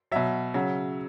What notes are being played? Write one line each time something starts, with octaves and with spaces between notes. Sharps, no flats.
B2 F#3 E5
C#3 F#3